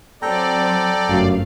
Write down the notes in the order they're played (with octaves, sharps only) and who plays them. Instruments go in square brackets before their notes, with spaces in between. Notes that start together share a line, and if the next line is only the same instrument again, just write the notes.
[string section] F#3 C4 [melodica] A4 G5 A#5 [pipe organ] D5
[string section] G1 A3 F5 [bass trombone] F#2